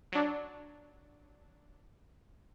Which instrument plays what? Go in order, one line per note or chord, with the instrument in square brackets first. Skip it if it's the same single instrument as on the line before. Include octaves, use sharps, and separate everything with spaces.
[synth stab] F#3 D4